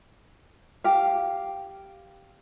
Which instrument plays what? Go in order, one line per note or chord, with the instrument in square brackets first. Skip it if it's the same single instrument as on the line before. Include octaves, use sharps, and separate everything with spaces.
[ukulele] G4 F5